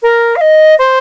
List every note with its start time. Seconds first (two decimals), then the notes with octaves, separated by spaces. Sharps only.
0.02 A#4
0.36 F5
0.41 D#5
0.78 C5